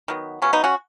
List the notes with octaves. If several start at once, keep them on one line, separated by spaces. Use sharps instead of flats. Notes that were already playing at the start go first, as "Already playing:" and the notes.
D#3 F#3 B3
C#3 F#3 B3 C#4
B3 D#4
C#4 F#4